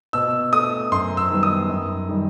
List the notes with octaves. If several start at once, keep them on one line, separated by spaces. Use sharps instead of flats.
B2 E6
A3 D#6
F#2 C6
E6
D#3 G3 B3
D#6
F#2
D#3 G3